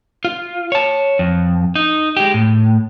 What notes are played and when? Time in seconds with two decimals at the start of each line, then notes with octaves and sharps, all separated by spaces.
0.25 F4
0.72 C#5 A5
1.19 F2
1.75 D#4
2.17 G#3 G4
2.34 A2